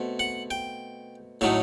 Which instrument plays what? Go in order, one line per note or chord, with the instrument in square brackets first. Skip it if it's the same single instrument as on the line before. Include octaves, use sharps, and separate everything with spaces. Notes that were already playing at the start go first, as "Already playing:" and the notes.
Already playing: [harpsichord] B2 A3 C4
F#5
G5
A2 F#3 A3 D#4 E5